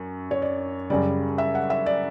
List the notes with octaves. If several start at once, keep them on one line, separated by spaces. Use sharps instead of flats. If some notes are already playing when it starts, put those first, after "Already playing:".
Already playing: F#2
C#5
D5
F#2 C#3 G3 D5
E5
F#5
E5
D5